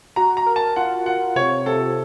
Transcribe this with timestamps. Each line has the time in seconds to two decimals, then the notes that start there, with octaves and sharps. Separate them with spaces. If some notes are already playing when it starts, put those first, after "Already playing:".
0.16 F#4 A#5
0.37 A#5
0.46 A#4
0.56 A5
0.76 F4 F#5
1.06 F4 F#5
1.36 C3 C#5
1.66 C3 A4